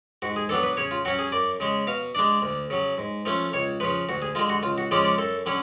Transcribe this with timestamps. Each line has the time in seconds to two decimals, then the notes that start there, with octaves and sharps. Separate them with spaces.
0.22 G#2 F#4
0.36 G#4
0.49 F#3 B3 D4 A4
0.63 B4
0.77 C#3 C#5
0.91 F4
1.05 F#3 C#4 F#4
1.19 G#4
1.32 F#2 D5
1.60 C#3 G#3
1.87 B2 F5
2.15 G#3 D4 D5
2.42 D2
2.70 C#3 F#3
2.98 G#2
3.25 F3 A3 C#4
3.53 C#2 C#5
3.80 F3 B4
3.84 C#3
4.09 D2 F#4
4.22 G#4
4.35 D3 G#3 F4
4.49 F#4
4.63 C#2 F4
4.78 F#4
4.91 C#3 F3 G#3 C#4 D5
5.04 D5
5.18 F#2 A4
5.46 D3 F#3 C#4